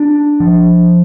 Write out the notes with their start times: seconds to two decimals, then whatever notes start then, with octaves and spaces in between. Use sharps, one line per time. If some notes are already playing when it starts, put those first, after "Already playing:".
Already playing: D4
0.40 F3